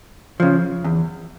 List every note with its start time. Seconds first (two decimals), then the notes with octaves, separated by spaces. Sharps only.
0.40 C#3 F3
0.84 E2